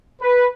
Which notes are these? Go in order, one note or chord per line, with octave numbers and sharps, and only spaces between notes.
B4